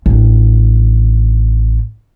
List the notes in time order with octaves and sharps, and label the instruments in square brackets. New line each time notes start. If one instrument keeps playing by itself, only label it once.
[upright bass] A1 D4